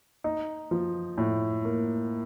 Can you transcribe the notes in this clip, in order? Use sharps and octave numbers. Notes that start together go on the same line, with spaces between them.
D#4
F3
A2
A#3